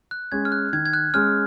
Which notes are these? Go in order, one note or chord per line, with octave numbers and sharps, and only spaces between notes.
F#6
G#3 C#4 G#6
F6
F#6
D#3 G#6
G#6
F#6
G#3 C#4 F6